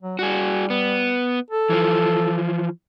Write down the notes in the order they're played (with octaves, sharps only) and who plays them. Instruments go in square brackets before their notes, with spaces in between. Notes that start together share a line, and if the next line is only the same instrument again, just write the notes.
[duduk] F#3
[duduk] G3 [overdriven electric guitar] F#4 G#4
[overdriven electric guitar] B3
[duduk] A4
[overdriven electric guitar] E3 F3